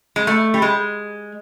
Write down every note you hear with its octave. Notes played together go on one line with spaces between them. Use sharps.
G#3
A3
G3
G#3